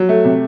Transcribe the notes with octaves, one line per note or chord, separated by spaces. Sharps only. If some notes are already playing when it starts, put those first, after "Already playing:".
Already playing: F#3
A3
C3